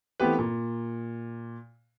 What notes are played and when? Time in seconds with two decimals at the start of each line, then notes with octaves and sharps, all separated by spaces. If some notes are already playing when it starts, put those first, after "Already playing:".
0.20 E3 A3 B3 C4 G4 B4
0.39 A#2